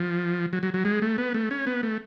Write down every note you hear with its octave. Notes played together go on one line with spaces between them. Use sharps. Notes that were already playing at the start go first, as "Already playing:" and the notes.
Already playing: F3
F#3
F#3
F#3
G#3
A3
B3
A3
C#4
B3
A3